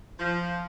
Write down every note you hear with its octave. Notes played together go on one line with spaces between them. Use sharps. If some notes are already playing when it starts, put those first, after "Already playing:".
F3